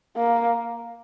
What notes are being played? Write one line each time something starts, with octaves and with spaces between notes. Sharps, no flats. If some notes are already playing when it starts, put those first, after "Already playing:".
A#3